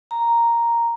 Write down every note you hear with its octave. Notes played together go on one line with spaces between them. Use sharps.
A#5